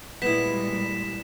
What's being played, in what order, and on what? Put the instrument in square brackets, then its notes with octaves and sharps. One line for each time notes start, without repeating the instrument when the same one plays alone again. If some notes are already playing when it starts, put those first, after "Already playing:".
[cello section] A#2 G3 G#3 [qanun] B3 E4 [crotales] B6 E7